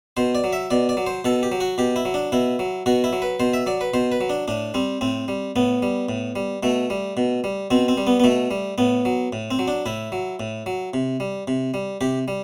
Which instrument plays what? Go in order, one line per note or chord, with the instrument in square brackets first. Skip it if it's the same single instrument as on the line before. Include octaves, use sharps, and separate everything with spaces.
[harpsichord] B2 C5
D5
F#3
E5
B2 D5
D5
F#3
C5
B2 A4
G4
F#3
F#4
B2 G4
E4
F#3
D4
B2 E4
F#3
B2 F#4
E4
F#3
B4
B2 C5
E5
F#3 D5
B4
B2 C5
B4
F#3
D4
A2 D4
G3 C4
A2 C4
G3
A2 B3
G3
A2
G3
B2 A3
G3
B2
G3
B2 C4
C4
G3
B3
B3
B2 A3
G3
A2 B3
F#3
A2
C4
F#3
D4
A2 E4
F#3
A2
F#3
C3
G3
C3
G3
C3 G4
G3